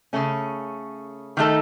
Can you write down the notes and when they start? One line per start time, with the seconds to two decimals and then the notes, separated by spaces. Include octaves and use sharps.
0.13 C#3 A3 C#4
1.37 D#3 A3 D#4 A4